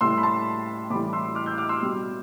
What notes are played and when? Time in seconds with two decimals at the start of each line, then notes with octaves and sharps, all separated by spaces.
0.01 A2 G3 C6 E6
0.18 B5
0.23 A5 C6
0.90 A2 E3 G3 B5 D6
1.13 C6 E6
1.35 D6 F6
1.46 E6 G6
1.58 D6 F6
1.69 C6 E6
1.80 B2 G3